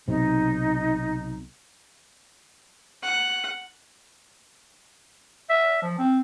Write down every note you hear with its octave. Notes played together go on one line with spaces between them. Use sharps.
B1 C3 D#4
F#5
E5
F3
C4